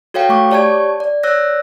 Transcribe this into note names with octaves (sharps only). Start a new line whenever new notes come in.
F#4 A4 C#5 F5 G5
A3 C#6 D6
G4 C#5 D5 A5 C#6 G#6
D5
C#5 D5 E6 F#6 A#6